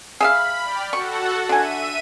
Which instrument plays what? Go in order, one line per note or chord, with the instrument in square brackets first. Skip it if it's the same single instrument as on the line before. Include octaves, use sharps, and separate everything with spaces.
[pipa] G#4 E5 F5 [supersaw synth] B5
[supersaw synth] D5 G5 F6
[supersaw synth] F#4 A4 F#5 [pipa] C#6
[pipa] D3 G#5 [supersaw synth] E5 D#7